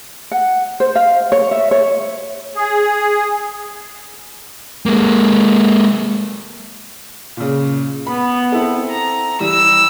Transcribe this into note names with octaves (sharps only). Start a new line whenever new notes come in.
F#5
C5
F5
C#5
E5
C#5
G#4
G#3 A#3
A#2 C#3
B3 B5
C4 E4 A4
A#5
E3 G3 E6